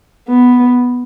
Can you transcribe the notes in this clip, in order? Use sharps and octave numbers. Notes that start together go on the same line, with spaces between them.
B3